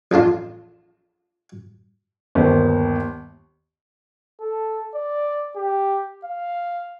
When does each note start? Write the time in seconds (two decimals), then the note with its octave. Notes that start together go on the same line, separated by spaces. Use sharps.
0.11 A1 F2 D4 F4
2.35 G1 D#2 A#4 C5
4.40 A4
4.95 D5
5.56 G4
6.25 F5